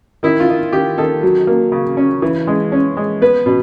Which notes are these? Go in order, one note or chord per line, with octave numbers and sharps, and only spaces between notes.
D#3 E4
F4
D#3
D#3 G4
D#3 A4
F#3
A#3
C#3
C#4
E3
G#3
C#4
G#3
B3 B4
B2